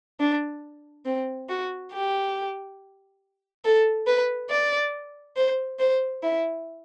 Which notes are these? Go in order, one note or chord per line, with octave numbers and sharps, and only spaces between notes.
D4
C4
F#4
G4
A4
B4
D5
C5
C5
E4